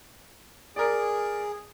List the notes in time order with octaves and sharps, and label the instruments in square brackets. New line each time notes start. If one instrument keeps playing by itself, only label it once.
[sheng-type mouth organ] G#4 [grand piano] A#4 D5